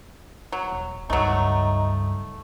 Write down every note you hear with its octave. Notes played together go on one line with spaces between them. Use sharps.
F#3
D#1
C#2 G2 F#3 A3 D#4